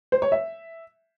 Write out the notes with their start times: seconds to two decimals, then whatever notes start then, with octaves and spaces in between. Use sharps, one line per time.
0.12 C5
0.22 C#5
0.32 E5